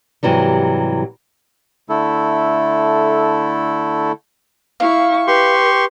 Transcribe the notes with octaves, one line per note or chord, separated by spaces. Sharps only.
G#2 C3 E3 F#3 G3
D3 A3 E4 A4
E4 F5 C#6
G4 B4 C6 C#6